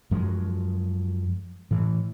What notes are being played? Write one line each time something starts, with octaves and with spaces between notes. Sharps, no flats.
F#2 F3 F#3 G#3
A2 E3